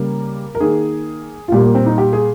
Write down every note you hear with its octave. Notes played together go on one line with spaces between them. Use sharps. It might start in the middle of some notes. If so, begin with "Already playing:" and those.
Already playing: C#3 G3 A#3 A#4
A#4
D#3 A#3 G#4
F4
A#2 G3 A#3 G4
A#3
C4
D#4
G4
G#4